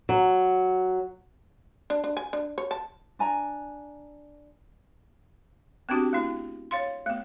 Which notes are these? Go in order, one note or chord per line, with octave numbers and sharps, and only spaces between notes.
F#3
D4
D4
G#5
D4
C#5
A5
D4 G#5 A#5
B3 C4 D4 F#4 G4
A3 B3 E4
C#5 F5 C6
A3 B3